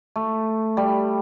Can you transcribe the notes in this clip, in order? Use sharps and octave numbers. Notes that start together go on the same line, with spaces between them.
A3
G3